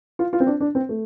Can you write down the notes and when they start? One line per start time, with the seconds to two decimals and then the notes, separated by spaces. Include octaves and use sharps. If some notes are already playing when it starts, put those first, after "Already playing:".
0.19 F4
0.33 F4
0.40 C4
0.47 D4
0.61 D4
0.75 C4
0.89 A3